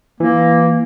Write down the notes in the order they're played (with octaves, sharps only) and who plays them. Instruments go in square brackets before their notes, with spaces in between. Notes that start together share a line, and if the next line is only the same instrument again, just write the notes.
[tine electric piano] E3 [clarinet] A#3